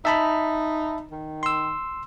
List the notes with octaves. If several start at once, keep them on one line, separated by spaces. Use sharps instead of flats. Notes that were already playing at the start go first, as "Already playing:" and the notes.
D#4 E5 A5 B5
D#3
C6 E6